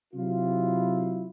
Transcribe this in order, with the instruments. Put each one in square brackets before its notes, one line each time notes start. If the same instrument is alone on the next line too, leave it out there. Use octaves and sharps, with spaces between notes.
[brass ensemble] C3 F#3 E4 F4